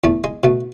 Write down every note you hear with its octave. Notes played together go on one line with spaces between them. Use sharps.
E2 A3
G#3
B2 A3